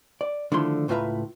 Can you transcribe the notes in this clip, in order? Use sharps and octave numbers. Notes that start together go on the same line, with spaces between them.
D5
D3 D#3 F3 A3 E4 C6
C#2 A2 F4 B4 E5 A#5